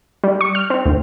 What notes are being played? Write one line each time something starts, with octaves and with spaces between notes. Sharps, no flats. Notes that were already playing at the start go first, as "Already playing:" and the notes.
G3
C#6
F6
C4
D2